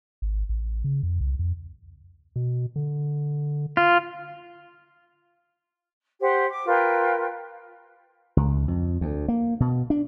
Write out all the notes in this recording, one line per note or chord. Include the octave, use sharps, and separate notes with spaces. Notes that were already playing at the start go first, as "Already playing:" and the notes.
G#1
A1
C#3
F2
C2
F2
B2
D3
F4
G4 C5 F#5
D6
F4 A#4 B4 G5
C#2
F2
D2
A#3
B2
D4